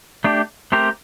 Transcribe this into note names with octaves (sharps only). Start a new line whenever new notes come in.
A3 D4 G4
A3 C4 G4 A#4